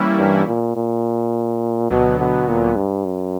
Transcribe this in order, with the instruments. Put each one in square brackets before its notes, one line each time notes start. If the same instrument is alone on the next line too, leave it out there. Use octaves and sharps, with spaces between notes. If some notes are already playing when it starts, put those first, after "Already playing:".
Already playing: [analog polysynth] E3 G3 A#3 C#4 E4
[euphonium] G2
A#2
A#2
[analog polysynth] D2 D3 F#3 B3 [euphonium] B2
[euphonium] B2
A#2
G2
F#2